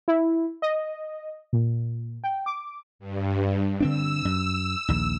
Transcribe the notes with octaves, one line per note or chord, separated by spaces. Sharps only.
E4
D#5
A#2
G5
D6
G2
D3 C4 D4 E6
F#2
A#1 D#2